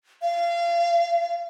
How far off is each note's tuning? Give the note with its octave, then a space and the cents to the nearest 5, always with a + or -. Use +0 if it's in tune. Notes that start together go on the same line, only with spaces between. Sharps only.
F5 -30